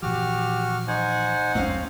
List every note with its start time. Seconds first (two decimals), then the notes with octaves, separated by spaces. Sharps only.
0.02 A#2 E3 F3 F#4 G4 D6 F6
0.88 D#4 C5 F#5 G#5
1.55 G#1 D#2 F#3 C4 C#4 F5